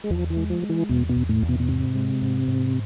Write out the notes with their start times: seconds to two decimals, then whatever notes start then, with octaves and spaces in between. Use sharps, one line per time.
0.04 G#3
0.10 E2 F3
0.30 E3
0.37 G#3
0.50 F3
0.62 G#3
0.70 E3
0.89 E2 B2
1.09 B2
1.16 E2
1.29 A2
1.43 E2
1.49 B2
1.60 B2
1.68 G#2 C3
1.95 G#3
2.22 G#2
2.48 G#2